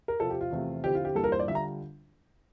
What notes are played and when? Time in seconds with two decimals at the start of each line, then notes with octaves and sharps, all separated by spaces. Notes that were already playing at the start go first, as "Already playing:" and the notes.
0.08 A#4
0.19 C3 F3 C4 F4 A4
0.30 G4
0.41 F4
0.51 E2 C3 F3 A3 C4
0.83 D3 F3 C4 E4 G4
0.95 F4
1.05 G4
1.15 G2 E3 A#3 F4 A4
1.24 A#4
1.32 C5
1.39 D5
1.48 D3 G3 D4 F4 E5
1.55 A#5